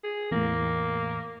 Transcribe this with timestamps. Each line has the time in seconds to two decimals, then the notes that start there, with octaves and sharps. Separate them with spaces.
0.04 G#4
0.31 E2 A2 A#3